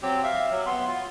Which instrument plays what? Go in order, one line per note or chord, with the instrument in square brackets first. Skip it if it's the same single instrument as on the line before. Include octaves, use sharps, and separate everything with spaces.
[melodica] F#3 C4 G4
E5 F5
F#3
B3 C6
F4